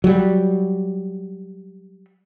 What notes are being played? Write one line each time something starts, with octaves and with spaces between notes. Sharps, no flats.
F#3 G3